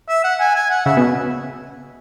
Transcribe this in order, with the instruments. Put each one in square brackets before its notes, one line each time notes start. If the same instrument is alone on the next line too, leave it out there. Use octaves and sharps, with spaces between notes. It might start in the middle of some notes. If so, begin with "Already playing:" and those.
[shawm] E5
F#5
G#5
G#5
F#5
[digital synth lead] C#3 [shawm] E5
[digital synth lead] B2